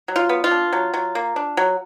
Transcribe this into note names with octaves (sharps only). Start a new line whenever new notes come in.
F#3
F4
B3
F4
D4
F#3
F#3
A#3
D4
F#3